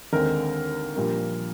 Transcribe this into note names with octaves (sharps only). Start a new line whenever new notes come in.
D#2 D3 G#3 C4 A#4
A#1 A#2 G3 A#3